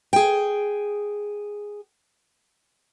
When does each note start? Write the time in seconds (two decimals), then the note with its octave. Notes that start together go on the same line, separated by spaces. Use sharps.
0.13 G#4 G5